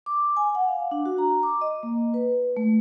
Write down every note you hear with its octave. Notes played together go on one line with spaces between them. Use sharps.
D6
G#5
F#5
F5
D4
F#4
A#5
D6
D#5
A#3
B4
A3